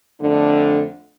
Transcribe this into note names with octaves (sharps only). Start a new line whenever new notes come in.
F2 D3 A3 D4